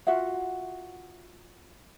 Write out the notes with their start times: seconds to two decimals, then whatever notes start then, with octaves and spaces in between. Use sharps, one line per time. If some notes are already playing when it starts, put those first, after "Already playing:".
0.07 F4 F#4 E5 F#5